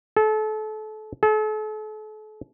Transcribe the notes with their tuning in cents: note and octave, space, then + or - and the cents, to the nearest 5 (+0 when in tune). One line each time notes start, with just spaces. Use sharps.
A4 -30
A4 -40